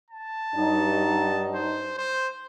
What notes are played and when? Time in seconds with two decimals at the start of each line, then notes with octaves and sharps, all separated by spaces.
0.11 A5
0.55 G2 F#3 D#4
1.55 C5
1.98 C5